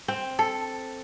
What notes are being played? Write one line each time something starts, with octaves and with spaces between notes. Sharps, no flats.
C4
A4